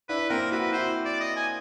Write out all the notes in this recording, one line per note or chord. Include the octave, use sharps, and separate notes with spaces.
D4 E4 B4
A#3 C4 A#4
E4 F#4 B4
E4 F#4 C5
D5
D#5
G#5